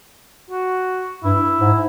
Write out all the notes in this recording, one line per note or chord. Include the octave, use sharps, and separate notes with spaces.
F#4
G2 E4
G#2